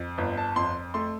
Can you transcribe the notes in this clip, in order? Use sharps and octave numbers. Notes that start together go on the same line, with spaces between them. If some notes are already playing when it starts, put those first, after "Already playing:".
Already playing: F2
G1
A5
F2 C6
A3 C6